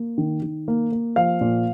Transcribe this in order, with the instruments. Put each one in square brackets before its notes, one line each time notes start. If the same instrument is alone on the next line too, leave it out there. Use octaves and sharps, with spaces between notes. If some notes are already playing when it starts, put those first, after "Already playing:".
Already playing: [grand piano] A#3
D#3
D#3
A#3
A#3
F3 F5
A#2